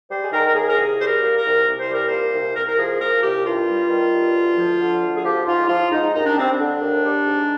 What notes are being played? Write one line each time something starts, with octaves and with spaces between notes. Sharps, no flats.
G3 C5
G#4
D#3 A#4
A#4
D#2 G#4
A#4
C2 G#4
G3 C5
A#4
A#2
A#4
C2
C2
C5
G3 A#4
A#2 C5
C2
C2 A#4
A#4
F3 G#4
A#2 A#4
C2 G4
G2 F4
G3
D#3
G2
D2
F3
D3
D2
G#4
F3 G4
G#2 F4
F3 F4
G#2 D#4
D#2 D#4
D4
G3 C4
D4
D3
D#2
G3
G#2